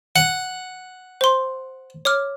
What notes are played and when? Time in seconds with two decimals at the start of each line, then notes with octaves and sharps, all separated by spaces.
0.16 F#5 C#7
1.21 C5 C6
2.05 C#5 D6 F6